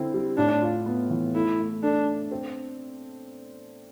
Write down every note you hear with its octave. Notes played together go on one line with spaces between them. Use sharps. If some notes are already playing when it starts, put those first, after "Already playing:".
Already playing: D3 C4 E4
G3
A2 D4
F4
B3
E3
A3 E4
A3
D4 A4
D4
C4